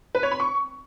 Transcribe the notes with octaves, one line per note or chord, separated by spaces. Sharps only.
B4
C#5
B5
C#6